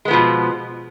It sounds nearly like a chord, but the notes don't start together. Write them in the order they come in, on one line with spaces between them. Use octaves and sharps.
G#3 B3 F3 B2